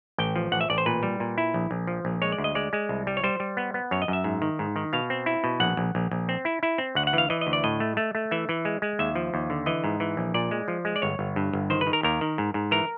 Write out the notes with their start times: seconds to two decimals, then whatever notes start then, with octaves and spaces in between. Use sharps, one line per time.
0.18 A1 G5
0.36 F3
0.52 A1 F#5
0.61 E5
0.70 A1 D5
0.78 C5
0.86 A#2 B4
1.03 G3
1.20 A#2
1.38 E4
1.54 A#1
1.71 A#1
1.87 F3
2.05 A#1
2.22 G#3 C#5
2.32 D5
2.38 D2
2.44 D#5
2.55 G#3 D5
2.73 G#3
2.89 C2
3.07 G3
3.17 C#5
3.24 G3 C5
3.40 G3
3.57 B3
3.74 B3
3.91 F#2 C#5
4.02 D#5
4.08 F#2 E5
4.24 G#2
4.42 D#3
4.59 G#2
4.76 D#3
4.93 B2 F5
5.10 C4
5.26 E4
5.44 B2
5.60 A#1 F#5
5.77 A#1
5.95 A#1
6.11 A#1
6.29 C4
6.45 E4
6.63 E4
6.78 C4
6.95 D2 F#5
7.07 F#5
7.13 E3 F5
7.30 E3 D#5
7.41 D#5
7.47 D2
7.53 D5
7.64 A2 D#5
7.80 A3
7.97 A3
8.15 A3
8.31 E3 E5
8.49 E3
8.65 G#3
8.82 G#3
8.99 D#2 E5
9.15 F3
9.34 D#2
9.50 D3
9.66 E3 D#5
9.84 G#2
10.00 E3
10.17 A#1
10.34 A#2 D5
10.51 G#3
10.68 F3
10.85 G#3
10.96 D5
11.02 G1 C#5
11.19 G1
11.36 G2
11.53 G1
11.70 D#3 C5
11.81 B4
11.87 D#3
11.93 A#4
12.03 D#2 A#4
12.21 D#3
12.38 G#2
12.54 G#2
12.71 E3 A#4